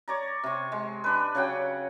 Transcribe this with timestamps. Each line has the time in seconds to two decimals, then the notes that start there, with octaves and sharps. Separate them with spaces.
0.08 C#5 D5 A#5
0.44 C3 C#6
0.72 G#3
1.04 D4 B4
1.35 C#3 F#3 F#5 G5